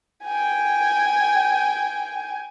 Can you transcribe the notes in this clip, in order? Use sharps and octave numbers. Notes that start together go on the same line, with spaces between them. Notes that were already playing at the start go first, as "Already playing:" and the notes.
G5 G#5